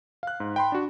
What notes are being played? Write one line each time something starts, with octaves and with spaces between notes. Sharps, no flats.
F5 F#6
G#2
G5 B5 C6
D4 F#4